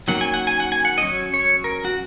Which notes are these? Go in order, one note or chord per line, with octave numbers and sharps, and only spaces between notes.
D#3 F#3 A#3 C#4 F#5
G#5
F#5
G#5
F#5
G#5
F#5
D#5
F#3 C#4 C#5
C#5
A#4
F#4